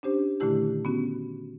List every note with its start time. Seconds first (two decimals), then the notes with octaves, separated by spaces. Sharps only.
0.03 C#4 D4 G4 C5
0.40 A#2 D3 D#3 A3 E4 G4
0.85 B3 C#4 F#4